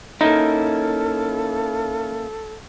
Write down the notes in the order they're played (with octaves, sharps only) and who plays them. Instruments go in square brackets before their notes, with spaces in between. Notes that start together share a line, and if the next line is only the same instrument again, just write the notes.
[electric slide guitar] A#3 C#4 E4 [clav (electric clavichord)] D#4 [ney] A4